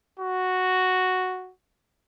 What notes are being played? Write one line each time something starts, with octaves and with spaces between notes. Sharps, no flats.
F#4